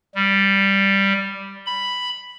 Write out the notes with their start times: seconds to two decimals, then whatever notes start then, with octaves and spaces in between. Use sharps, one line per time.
0.15 G3
1.66 B5